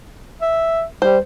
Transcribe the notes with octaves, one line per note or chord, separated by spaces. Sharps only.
E5
G3 C5